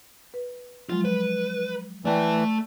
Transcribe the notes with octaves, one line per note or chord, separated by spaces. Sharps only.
B4
F3 F#3 G#3 F4
B4
E3 A3 D5 G5 A5